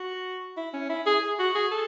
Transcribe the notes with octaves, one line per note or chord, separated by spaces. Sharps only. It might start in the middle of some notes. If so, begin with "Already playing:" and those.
Already playing: F#4
E4
C#4
E4
G#4
F#4
G#4
A4